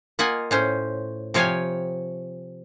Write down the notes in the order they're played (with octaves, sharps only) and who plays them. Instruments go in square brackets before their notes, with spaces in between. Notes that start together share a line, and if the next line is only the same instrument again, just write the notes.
[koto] A#3 F4 D#5 F#5 G#5
A2 C#4 C5
C3 F3 C#5 F5 G5 G#5